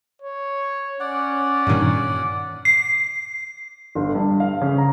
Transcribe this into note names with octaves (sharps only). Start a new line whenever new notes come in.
C#5
C#4 D5 F#5
G2 A#2 D#3
C7
G1
G2
F5
C#3
A#5